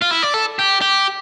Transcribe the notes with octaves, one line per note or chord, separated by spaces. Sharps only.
F4
E4
D5
A4
G4
G4